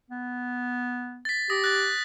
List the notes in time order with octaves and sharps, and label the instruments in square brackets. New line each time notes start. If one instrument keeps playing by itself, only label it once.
[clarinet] B3
[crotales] A6 B6
[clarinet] G4 [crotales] D#6 A#6
[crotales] F#6 A6